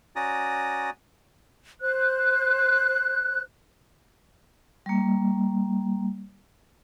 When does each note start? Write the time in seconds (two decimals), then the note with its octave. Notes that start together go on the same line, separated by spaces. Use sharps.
0.16 C#4 F#4 D5 A#5 D#6
1.81 C5 F#6
4.86 G3 A#3